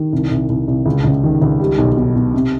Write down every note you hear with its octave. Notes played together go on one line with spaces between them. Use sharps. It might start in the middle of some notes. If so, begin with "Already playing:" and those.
Already playing: D#3
C2
C2
C2
C2
C#2
C#2
D#3
C#2
G3
B1
B2
B2
C3